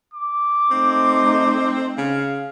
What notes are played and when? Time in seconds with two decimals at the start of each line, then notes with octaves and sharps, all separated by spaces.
0.14 D6
0.71 A3 C4 D#4
1.98 C#3 F5